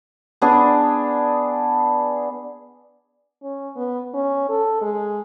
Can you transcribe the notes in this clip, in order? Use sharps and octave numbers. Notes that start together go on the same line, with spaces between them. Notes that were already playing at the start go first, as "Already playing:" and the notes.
B3 D4 G#4
C#4
B3
C#4
A4
G#3